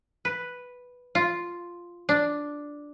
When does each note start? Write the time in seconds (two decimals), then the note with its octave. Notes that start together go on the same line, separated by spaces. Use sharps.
0.25 B4
1.15 F4
2.09 D4